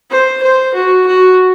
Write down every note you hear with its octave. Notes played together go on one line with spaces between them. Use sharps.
C5
C5
F#4
F#4